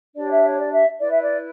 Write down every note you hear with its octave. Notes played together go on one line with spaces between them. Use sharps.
D4 G4 C#5 D5
E5
C#5
D5
E5
E4 B4 D5
E5
D5